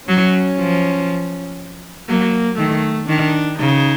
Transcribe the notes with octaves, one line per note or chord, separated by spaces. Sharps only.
F#3 C#4
F3
F#3 A#3
D#3 A3
D#3 D4
C#3 D#4